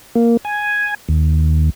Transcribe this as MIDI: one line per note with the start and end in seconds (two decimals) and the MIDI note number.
0.15 0.37 58
0.45 0.94 80
1.09 1.70 39